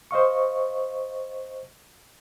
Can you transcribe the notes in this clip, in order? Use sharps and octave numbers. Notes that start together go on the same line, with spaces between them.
C5 D#5 F5 C#6